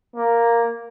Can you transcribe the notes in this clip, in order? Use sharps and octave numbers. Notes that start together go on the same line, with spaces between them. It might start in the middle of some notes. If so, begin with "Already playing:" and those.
A#3